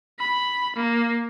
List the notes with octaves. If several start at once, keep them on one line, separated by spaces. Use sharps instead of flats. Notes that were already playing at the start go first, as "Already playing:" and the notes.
B5
A#3